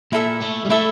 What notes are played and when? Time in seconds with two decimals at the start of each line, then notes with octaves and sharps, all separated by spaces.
0.13 A#2 E4 A4 E5
0.41 A3
0.66 G3
0.70 A3 E4 A4 E5